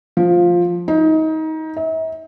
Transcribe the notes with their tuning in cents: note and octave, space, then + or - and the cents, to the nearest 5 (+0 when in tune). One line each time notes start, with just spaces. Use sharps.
F3 +5
D#4 +25
E5 -45